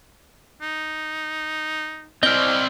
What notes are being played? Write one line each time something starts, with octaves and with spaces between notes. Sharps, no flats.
D#4
C4 E4 D5 D#5 F6 G6 G7